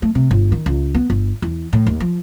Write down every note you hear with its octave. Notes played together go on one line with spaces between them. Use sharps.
A3
C3
G1
D#3
C#2
B3
G1
E2
A2
D#2
F3